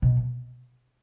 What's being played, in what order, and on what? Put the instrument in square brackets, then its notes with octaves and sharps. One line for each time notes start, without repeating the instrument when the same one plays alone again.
[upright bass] B2